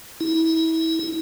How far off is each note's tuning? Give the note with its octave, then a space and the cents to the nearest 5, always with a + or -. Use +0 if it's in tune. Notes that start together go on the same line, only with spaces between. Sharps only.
E4 -30